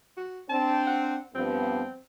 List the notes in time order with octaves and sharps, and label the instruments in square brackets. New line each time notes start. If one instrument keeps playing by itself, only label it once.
[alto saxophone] F#4
[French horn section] C4 D4 [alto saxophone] A5
[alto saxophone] F#5
[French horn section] G2 F3 B3 [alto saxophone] C4